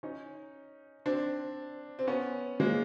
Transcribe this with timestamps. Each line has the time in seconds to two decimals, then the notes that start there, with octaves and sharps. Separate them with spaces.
0.03 C#4 D#4
1.06 C4 D4
1.99 C4
2.07 B3 C#4
2.60 G#3 A#3